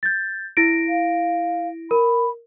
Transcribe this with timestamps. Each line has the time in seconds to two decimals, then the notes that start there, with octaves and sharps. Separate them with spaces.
0.03 G6 A6
0.57 E4 A#6 D7
0.89 F5
1.91 A#4 B5